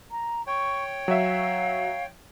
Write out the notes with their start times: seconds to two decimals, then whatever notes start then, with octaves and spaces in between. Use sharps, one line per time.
0.11 A#5
0.47 C#5 G5 C#6
1.08 F#3 E5 F5